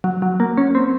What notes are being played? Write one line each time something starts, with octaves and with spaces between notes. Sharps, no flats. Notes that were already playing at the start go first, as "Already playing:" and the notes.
F#3
F#3
A#3
C#4
C4